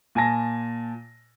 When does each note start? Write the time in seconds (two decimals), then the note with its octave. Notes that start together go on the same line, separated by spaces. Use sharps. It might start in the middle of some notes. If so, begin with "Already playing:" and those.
0.15 A#2 G#5 A5 A#6